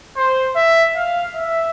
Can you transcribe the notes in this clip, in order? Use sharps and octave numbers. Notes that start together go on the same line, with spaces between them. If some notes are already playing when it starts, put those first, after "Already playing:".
C5
E5
F5
E5